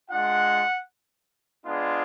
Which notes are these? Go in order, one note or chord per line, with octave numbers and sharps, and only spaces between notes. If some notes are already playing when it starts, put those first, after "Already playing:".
G#3 D4 F4 F#5
G#3 B3 D4 F4